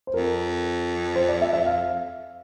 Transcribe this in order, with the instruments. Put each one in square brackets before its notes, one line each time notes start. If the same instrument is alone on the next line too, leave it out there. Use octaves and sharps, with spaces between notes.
[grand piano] C5
[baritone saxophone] F2 [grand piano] A#4
[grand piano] C5
D5
E5
E5
F5